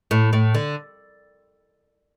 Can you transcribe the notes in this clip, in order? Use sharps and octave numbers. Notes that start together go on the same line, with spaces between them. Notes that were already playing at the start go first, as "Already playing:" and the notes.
A2
A2
D3